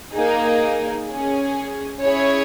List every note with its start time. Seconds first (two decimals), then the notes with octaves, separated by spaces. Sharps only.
0.13 A#3 D#4 G#4
1.07 C#4 G#4
2.01 C#4 E4 G#4 C#5